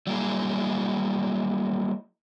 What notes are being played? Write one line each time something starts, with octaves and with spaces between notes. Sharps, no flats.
F#3 G3 A#3 E4 G#4